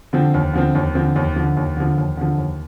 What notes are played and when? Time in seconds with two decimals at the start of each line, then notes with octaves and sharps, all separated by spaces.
0.13 D3 F3 C4
0.34 D#2
0.53 D3 F3 C4
0.75 D#2
0.95 D3 F3 C4
1.16 D#2
1.36 D3 F3
1.57 D#2
1.77 D3 F3
1.98 D#2
2.17 D3 F3
2.38 D#2